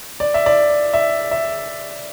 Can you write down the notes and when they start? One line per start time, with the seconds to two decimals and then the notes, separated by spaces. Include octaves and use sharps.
0.20 D5
0.34 E5
0.46 D5
0.94 E5
1.31 E5